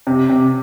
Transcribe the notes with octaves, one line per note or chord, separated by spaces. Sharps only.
C3
C3